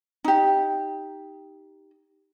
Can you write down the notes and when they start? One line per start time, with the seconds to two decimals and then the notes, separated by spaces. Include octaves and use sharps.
0.24 D#4 G4